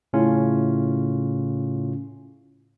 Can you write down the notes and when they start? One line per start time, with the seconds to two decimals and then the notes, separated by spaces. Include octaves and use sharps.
0.13 A2 C#3 C#4 E4 F4